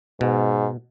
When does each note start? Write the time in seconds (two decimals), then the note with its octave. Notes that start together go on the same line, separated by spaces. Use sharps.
0.21 G#2 B2